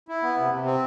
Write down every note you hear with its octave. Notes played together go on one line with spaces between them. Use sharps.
E4
B3
C3
C3
C4